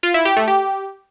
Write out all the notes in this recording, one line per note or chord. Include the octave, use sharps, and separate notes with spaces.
F4
E4
G4
A3
G4